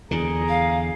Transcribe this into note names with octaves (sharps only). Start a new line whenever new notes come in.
E2 D3 G#4 A#5
F5